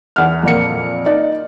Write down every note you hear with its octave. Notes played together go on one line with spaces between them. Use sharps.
E2 F#5 F6
F2 A#2 A#3 C#7
D#4 D5